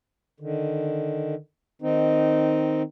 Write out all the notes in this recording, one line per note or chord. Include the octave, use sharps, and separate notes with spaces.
D3 D#3
D#3 C4 D#4